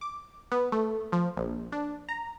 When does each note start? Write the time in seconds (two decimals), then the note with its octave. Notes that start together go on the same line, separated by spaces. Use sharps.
0.01 D6
0.52 B3
0.72 A3
1.12 F3
1.37 A#1
1.72 D4
2.09 A#5